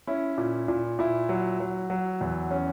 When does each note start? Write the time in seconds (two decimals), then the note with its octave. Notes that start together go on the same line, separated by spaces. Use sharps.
0.07 C#4 E4
0.38 A#2
0.68 A#2
0.99 A#2 E4
1.29 F#3
1.60 F#3
1.90 F#3
2.21 E2
2.51 C#4